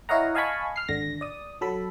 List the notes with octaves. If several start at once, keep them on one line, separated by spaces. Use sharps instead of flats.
E4 C#5 D#5 F5 F#5 A#5
D#5 F5 G#5 A5 B5 C#6
F6 C7
G#1 D3 A#6
D5 D#6
F#3 A4 B5